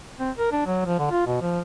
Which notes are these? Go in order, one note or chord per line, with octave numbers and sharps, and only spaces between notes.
C4
A#4
D4
F#3
F3
D3
F4
B2
F3